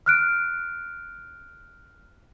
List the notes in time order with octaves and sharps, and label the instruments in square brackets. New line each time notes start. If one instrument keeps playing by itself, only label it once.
[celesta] F6 F#6 D7